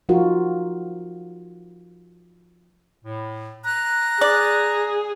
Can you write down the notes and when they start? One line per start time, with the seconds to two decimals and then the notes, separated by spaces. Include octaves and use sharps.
0.09 F3 D#4 F4 F#4 A#4
3.05 A2
3.65 A#5 F#6
4.21 G#4 D5